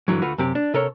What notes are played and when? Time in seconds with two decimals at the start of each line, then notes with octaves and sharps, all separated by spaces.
0.08 G2 D3 E3 F#3
0.22 D2 A3 F4 F#4 B4
0.38 F#2 C3 G4
0.55 D4
0.74 C3 A4 A#4 C#5